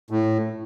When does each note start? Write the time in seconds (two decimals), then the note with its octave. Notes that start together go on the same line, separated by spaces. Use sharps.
0.10 A2